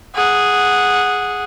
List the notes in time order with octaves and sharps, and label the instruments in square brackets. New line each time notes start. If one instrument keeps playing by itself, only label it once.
[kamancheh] G#4 F#5